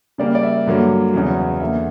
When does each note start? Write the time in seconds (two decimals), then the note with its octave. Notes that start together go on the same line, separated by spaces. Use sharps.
0.18 C#3 G3 A#3 D5
0.35 D5
0.43 E5
0.66 G2 D3 F#3 A#3
1.14 E2 C#3 F#3
1.60 E2 D3 A#3 E5